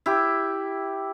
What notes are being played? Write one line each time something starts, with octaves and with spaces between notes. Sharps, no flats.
E4 G4